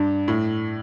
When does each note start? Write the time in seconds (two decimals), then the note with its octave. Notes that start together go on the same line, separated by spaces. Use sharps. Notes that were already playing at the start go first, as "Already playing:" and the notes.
Already playing: G2
0.28 A2